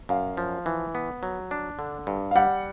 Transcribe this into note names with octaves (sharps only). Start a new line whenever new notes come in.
F#2 F5
F3
E3
B3
F#3
D4
D3
G2
F5
G3 F#5